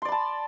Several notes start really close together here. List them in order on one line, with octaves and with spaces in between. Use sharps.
C6 D5 B5 A5